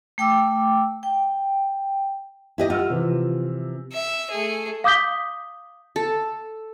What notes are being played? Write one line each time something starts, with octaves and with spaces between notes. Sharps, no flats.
A3 G5 D6 E6
G5
E4 G4 D#5
F4 F#5 E6 F6
C3 E3 F3
E5
A3 G#4
F5 D6 D#6 G6 B6 G7
A4